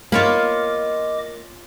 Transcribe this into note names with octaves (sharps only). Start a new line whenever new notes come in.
A#3 F4 C#5 D#5 B5 D6